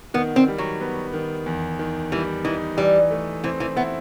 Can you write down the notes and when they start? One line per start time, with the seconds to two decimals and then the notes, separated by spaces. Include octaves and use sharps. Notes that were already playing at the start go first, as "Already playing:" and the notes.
0.14 D#3 B3
0.36 C4
0.48 G3
0.58 F#3
0.81 B3
1.14 D#3
1.46 E2
1.79 D#3
2.12 E3 G3
2.44 E3 D#4
2.77 E3 G3
3.11 A3
3.44 E3 C4
3.60 E3
3.76 B3 E4